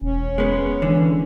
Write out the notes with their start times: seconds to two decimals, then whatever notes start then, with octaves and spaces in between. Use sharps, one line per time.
0.02 E1 C#4
0.38 G#3 B3
0.82 D3 E3